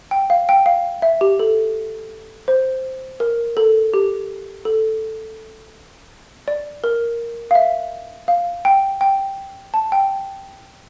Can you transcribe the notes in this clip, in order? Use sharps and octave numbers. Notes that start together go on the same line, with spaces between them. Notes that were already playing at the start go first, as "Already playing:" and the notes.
G5
F5
G5
F5
E5
G4
A4
C5
A#4
A4
G4
A4
D5
A#4
F5
E5
F5
G5
G5
A5
G5